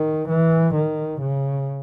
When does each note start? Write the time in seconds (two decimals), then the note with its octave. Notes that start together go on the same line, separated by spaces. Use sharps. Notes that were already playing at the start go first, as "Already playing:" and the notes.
Already playing: D#3
0.29 E3
0.74 D#3
1.21 C#3